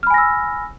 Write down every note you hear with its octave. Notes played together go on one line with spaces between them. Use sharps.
G#5 B5 E6 F6 A#6